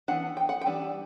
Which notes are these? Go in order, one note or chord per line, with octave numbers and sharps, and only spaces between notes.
E3 B3 D4 F#5
G5
F#5
G5
E3 G3 B3 D4